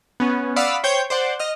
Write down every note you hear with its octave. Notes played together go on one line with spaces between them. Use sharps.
B3 C#4
D5 F5 F#5 B5 D#6 E6
C5 C#5 G5 G6
C5 D5 F#5
D#5 F6